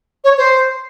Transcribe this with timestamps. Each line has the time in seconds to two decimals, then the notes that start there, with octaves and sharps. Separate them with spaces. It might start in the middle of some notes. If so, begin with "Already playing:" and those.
0.24 C#5
0.38 C5